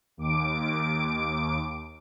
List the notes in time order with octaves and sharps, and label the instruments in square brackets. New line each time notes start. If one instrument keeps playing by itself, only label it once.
[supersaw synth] D#2 D6 D7